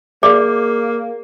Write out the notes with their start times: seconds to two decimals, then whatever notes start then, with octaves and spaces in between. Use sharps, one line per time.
0.23 A#3 G#4 D5